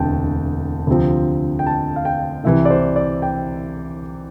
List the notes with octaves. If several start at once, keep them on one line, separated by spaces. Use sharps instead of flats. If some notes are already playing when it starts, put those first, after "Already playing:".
Already playing: E1 D2 C3 G5 A5
D2 C3 F3 C4
G5
A5
F5
G5
C2 C3 E3 E5
D5
C5
D5
G5